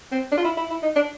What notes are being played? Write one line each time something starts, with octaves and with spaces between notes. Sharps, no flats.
C4
D4
F4
E4
E4
E4
D#4
D4